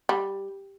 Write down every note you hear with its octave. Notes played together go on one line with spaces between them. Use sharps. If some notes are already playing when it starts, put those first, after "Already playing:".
G3